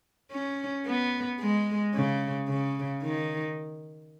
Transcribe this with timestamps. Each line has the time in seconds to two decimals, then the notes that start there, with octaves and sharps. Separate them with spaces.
0.32 C#4
0.86 B3
1.39 G#3
1.94 C#3
2.48 C#3
3.02 D#3